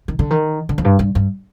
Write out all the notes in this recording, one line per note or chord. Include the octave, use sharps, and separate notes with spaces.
D#3
D3
D#3
D3
F2
G2
G2
G2